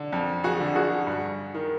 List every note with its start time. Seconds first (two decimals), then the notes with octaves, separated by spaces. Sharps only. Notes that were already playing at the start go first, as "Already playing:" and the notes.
Already playing: D3
0.12 F2
0.44 F#4 G#4
0.60 D3
0.75 F#4 G#4
1.07 G2
1.55 D#3